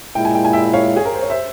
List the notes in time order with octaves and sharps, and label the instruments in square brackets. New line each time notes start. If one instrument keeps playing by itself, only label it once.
[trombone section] A#2 G#3 E4 [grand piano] G5
[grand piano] G#5
G5
G#5
E5 G5
E5
C#5 F5
G#4
A#4
C5
C#5
C5 E5